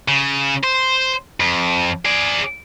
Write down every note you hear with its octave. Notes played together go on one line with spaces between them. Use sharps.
C#3
C5
F2
G#4 D5